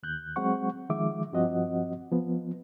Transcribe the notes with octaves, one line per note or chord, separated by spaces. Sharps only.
D#2 F#6 G6
F#3 G#3 C4 F#5 C#6
D#3 F3 G#3 E5 D6
G2 F3 C4 F#4 D#5 F#5
F3 B3